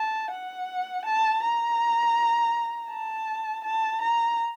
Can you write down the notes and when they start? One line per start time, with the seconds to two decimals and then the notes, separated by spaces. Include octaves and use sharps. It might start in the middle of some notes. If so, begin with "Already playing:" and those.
Already playing: A5
0.31 F#5
1.05 A5
1.43 A#5
2.90 A5
3.65 A5
4.01 A#5